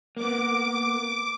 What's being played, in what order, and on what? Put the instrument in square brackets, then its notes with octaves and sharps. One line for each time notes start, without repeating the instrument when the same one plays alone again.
[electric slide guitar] A#3 B3 [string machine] D6